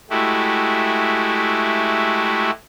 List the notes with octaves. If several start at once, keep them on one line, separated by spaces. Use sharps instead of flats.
G#3 A3 E4 F#4 G4